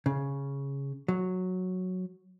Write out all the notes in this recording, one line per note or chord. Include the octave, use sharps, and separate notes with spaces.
C#3
F#3